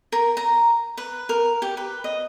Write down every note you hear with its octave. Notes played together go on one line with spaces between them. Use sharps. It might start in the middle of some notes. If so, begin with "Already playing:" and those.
A#4
A#5
B4
A#4
G4
B4
D#5